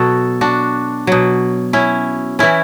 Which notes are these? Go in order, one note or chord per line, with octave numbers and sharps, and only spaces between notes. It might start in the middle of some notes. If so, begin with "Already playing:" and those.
Already playing: B2 F#3 F#4 A4
D4 F#4
B2 F#3
C#4 E4
E3 C#4 E4